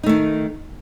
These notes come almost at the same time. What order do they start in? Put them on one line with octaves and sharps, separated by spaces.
D#4 A3 D#3